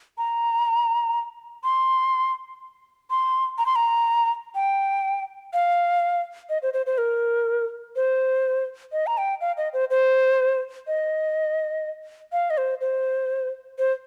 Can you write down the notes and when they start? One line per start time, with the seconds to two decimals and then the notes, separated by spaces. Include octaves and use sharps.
0.18 A#5
1.64 C6
3.10 C6
3.58 A#5
3.66 C6
3.76 A#5
4.55 G5
5.53 F5
6.49 D#5
6.63 C5
6.74 C5
6.86 C5
6.98 A#4
7.96 C5
8.92 D#5
9.07 A#5
9.18 G5
9.41 F5
9.57 D#5
9.73 C5
9.91 C5
10.87 D#5
12.32 F5
12.50 D#5
12.58 C5
12.81 C5
13.79 C5